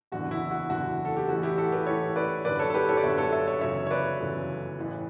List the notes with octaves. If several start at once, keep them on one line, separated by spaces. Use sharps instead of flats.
F#1 E2 D3 F#4
E4
F#4
F#1 E2 D3 F#4
A4
G4
A1 A2 E3 F#4
E4 G4
F#4 A4
G4 B4
A1 A2 E3 A4 C#5
B4 D5
G1 F#2 D3 B4 D5
A4 C#5
A4
G4 B4
A4 C#5
D5
G1 F#2 D3 C#5 E5
A4 C#5
C#5 E5
C#5 E5
G1 F#2 C#3 E3 C#5 E5
C#5
B4 D5
G1 F#2 C#3 E3
A1 A2 E3